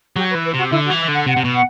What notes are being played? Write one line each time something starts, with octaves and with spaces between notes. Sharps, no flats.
F#3 G4
B4
E3
B4
C3 F#4
D3 E4
F#4
E3
E5
D3
F#5
C3 F#5
C3
B2
F#5